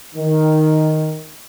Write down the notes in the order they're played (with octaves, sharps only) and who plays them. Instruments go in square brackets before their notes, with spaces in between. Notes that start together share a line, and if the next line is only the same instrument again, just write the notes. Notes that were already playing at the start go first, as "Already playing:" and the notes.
[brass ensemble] D#3